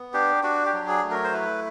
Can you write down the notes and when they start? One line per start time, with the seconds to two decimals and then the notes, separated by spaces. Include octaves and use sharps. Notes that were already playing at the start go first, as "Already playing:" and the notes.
Already playing: B3
0.14 D4 G4
0.43 D4 F#4
0.66 G4
0.73 F#3
0.88 G#4
1.03 A3
1.11 A#4
1.24 C5
1.33 E4 B4